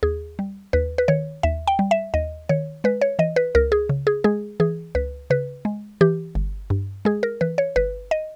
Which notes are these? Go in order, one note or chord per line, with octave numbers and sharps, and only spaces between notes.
D#2 G#4
G3
D#2 B4
B4
D#3 C#5
D#2 E5
G5
G3
E5
D#2 D#5
D#3 C#5
G#3 B4
C#5
E3 D#5
B4
C#2 A#4
G#4
C#3
G#4
G#3 G#4
E3 G#4
C#2 B4
C#3 B4
G#3
E3 G4
G1
G2
G#3 G#4
A#4
E3 B4
C#5
G1 B4
D#5